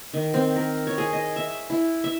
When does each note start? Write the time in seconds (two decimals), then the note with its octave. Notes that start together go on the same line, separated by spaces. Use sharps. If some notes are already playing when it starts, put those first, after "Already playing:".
0.14 D#3
0.34 C4
0.56 A#4
0.87 C#5
0.98 G#4
1.13 D#5
1.36 E5
1.70 E4
2.04 E5